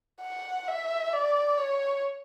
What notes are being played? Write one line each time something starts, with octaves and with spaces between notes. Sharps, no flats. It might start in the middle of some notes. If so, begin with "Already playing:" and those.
F#5
E5
D5
C#5